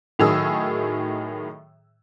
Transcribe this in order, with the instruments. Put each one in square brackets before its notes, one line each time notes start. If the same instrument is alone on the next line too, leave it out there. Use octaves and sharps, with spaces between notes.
[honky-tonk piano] A2 D#3 F#3 G#4 D#6 E6